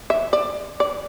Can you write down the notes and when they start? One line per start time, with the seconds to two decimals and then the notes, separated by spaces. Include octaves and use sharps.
0.10 E5
0.33 D5
0.80 D5